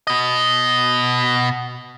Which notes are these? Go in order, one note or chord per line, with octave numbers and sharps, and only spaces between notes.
B2 D#5